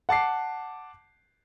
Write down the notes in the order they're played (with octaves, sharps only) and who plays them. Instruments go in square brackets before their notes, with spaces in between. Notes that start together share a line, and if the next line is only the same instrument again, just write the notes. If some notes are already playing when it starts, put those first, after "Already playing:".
[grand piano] F#5 A5 D6 C7